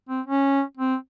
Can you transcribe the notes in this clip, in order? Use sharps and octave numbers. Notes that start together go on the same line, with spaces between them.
C4
C#4
C4